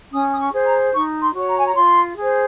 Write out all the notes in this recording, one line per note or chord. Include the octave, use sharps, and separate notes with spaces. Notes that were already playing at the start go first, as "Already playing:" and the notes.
C#4 D#6
D#6
C#6
G#4 C5
A#5
D#4 C#6
C6
F#4 C#5
A#5
G#5
A#5
F4 C6
G#4 C5